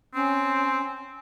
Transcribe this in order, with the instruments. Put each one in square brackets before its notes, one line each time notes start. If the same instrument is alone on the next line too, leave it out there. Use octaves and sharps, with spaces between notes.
[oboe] C4 [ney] C#4